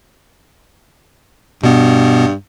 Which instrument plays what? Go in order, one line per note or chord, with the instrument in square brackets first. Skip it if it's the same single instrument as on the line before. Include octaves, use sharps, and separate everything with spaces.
[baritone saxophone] G2 [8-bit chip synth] B2 B3